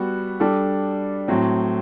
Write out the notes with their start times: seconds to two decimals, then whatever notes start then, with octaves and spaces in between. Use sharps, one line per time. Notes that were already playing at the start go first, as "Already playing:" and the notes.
Already playing: G3 B3 F#4
0.40 G3 D4 A4
1.28 A2 F#3 C4